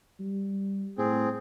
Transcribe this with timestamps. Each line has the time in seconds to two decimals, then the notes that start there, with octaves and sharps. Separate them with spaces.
0.19 G3
0.98 A2 C4 G#4